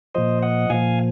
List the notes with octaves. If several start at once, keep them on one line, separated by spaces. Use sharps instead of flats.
A#2 F3 C5 D#5
D#5 F#5
A#2 F3 F5 G#5